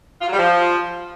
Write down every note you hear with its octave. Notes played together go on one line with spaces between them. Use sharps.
F4
F#3
G3
F3